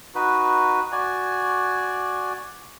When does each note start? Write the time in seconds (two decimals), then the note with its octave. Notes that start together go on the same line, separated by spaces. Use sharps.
0.15 D#4 F#4 B4
0.92 F#4 D5 G#5